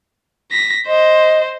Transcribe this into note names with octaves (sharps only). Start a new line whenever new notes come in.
A#6 B6
C5 D#5